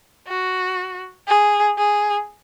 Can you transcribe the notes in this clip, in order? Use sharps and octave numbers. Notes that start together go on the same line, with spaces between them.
F#4
G#4
G#4